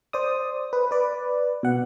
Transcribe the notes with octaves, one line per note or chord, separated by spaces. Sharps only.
C5 D5 D#6
B4
B4 D5
B2 F#5